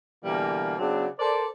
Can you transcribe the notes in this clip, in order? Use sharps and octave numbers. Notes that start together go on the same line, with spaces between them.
B2 D3 E3 G3 A#3
C#3 F#3 B3 C4 D4
A4 A#4 C5 D5